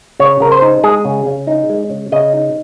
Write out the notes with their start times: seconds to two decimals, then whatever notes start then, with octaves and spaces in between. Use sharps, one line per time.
0.20 C#3 C#5
0.40 C#3 A#4
0.52 C5
0.62 D#4
0.83 G#3 G#4
1.05 C#3
1.26 C#3
1.47 D#4
1.69 G#3
1.90 C#3
2.12 C#3 D#5
2.33 D#4